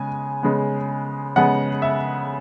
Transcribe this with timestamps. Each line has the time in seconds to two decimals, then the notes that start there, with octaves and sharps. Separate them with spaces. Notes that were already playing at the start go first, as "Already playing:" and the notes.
Already playing: C#3 G#3 B3 G#5
0.43 C#3 G#3 B3
1.36 C#3 G#3 B3 F#5
1.82 E5